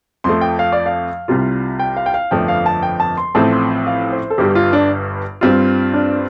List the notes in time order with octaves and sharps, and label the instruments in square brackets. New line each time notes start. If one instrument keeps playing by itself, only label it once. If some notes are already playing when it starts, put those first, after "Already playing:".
[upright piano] F2 F3 A3 [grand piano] C6
[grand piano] G5
F5
D5
F5
[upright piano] C2 C3 G3 F4
[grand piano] G5
F5
G5
F5
[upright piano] G1 F2 F3 A3 D4 [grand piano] G5
[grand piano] F5
A5
G5
A5
C6
[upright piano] A1 A2 F3 A3 C4 [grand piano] A5
[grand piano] C6
F5
C5
A4
[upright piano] G1 G2 G3 [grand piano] G4
[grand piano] F4
D4
[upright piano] G2 G3 C4 F4
[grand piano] D4